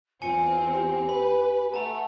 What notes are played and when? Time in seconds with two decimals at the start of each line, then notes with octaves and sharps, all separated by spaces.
0.22 E2 C4 F4 G#5 C#7
0.73 G4
1.09 B4 B5
1.74 A3 F#5 A5 A#5